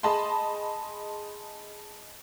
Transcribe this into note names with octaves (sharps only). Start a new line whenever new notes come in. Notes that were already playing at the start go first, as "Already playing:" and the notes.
G#4 D#5 A5 B5 C6